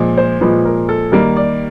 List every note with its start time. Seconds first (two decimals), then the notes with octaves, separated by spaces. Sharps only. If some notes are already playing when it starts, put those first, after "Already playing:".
Already playing: A#2 F3 G#3
0.18 C5
0.41 A#2 F3 G#3 B4
0.65 A#4
0.89 A4
1.12 D#3 G3 A#3 A#4
1.37 D5